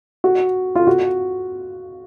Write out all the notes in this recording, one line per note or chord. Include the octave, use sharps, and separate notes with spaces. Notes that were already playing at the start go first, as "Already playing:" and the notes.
F#4
F4
F#4